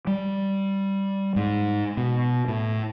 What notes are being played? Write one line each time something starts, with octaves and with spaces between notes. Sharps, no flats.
G3
G#2
B2
A2